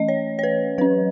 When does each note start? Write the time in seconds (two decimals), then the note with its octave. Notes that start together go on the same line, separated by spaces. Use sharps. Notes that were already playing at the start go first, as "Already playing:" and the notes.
Already playing: E3 A3 C#4 D#5
0.08 C#5
0.39 C#5
0.43 B4
0.78 F#3 C#4 B4